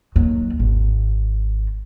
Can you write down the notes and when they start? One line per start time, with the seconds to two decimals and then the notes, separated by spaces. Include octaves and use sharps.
0.16 D#2 F#3
0.59 G#1